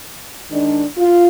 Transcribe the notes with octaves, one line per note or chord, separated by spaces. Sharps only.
D#3 G#3 D4
F4